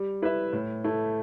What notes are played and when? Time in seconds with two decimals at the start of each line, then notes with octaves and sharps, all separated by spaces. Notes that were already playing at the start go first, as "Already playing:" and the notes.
Already playing: G3
0.22 E4 B4 E5
0.53 A2
0.84 A3 E4